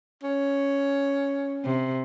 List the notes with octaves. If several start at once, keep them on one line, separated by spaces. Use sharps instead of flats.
C#4
C3